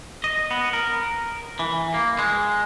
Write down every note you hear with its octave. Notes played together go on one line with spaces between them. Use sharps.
D#5
B3
A#4
E3
A#3
G#3